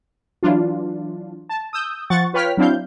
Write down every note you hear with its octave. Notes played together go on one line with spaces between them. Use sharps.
E3 F#3 D4 F4
A5
D#6 E6 G6
F3 F#5 C#6 A6
F4 B4 C#5 G5 F6 B6
F#3 C4 D4 E4 F5 G6